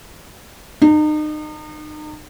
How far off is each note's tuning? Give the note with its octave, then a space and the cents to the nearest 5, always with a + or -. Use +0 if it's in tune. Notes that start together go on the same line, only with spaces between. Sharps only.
D#4 -35